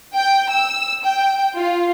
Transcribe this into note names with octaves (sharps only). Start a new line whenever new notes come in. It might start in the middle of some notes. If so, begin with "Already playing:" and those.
G5
E6
G5
F4